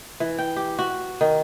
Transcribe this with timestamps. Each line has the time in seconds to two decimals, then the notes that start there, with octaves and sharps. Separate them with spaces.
0.20 E3
0.38 G5
0.56 G4
0.79 F#4
1.21 D#3